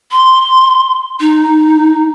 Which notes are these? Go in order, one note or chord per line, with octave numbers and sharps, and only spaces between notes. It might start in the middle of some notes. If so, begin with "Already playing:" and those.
C6
D#4